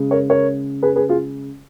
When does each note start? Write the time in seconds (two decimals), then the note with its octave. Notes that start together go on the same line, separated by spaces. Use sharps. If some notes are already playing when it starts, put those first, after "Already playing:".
Already playing: C#3 G#3
0.11 A#4 C#5
0.30 A#4 C#5
0.83 G#4 B4
0.96 G#4 B4
1.09 F4 G#4